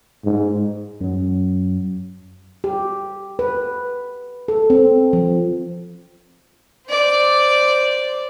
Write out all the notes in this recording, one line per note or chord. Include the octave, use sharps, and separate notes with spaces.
G#2
F#2 F#3
G4
B4
A4
C4
F3
C5 D5